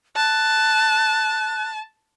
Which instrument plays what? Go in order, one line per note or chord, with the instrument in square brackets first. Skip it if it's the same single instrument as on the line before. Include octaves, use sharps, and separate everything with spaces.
[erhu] A5 [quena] F#6